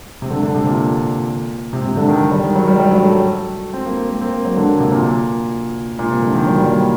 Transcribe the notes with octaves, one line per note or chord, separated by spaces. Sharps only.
C3
D3
D3
C3
A#2
C3
C3
D3
D#3
G3
D#3
F#3
G3
G3
F#3
A3
C4
A#3
A#3
C4
A#3
F#3
D3
A#3
C3
A#2
A#2
C3
D3
D#3
F#3
G3
A#3